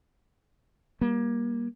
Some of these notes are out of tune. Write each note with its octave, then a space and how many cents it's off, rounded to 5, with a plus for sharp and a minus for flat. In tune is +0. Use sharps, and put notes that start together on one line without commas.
G3 +0 A#3 +25